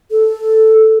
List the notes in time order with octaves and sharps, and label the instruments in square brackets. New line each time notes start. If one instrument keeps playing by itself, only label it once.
[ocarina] A4